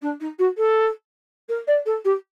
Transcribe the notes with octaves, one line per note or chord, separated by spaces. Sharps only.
D4
D#4
F#4
A4
A#4
D5
A4
G4